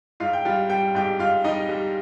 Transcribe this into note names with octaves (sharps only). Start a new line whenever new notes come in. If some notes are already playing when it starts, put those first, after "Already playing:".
G#2 F4 F5
G5
G3 F4 F5
G3 G5
G#2 G4 G5
G#2 F4 F5
G3 D#4 D#5
G3